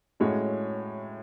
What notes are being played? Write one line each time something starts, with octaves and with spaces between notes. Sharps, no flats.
A2 G#3 C#4 F#4 C#5